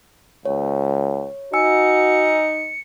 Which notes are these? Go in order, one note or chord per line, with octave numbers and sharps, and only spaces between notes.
C#2 C#5
D#4 F#4 G#5 E6 C#7